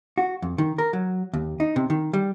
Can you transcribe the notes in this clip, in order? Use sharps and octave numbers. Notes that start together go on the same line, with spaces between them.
F#4
F2
D#3
A#4
F#3
D#2
D#4
C3
D#3
G3